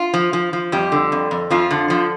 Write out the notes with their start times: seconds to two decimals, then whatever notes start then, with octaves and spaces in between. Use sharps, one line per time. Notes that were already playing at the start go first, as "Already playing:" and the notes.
Already playing: F4
0.14 F3
0.33 F3
0.53 F3
0.72 F2 G3 G4
0.92 D3
1.12 F2
1.31 F2
1.50 F2 F3 F4
1.71 D3
1.90 F3